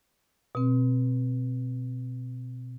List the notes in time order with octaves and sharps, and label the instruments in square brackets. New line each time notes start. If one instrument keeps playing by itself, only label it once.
[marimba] B2 C4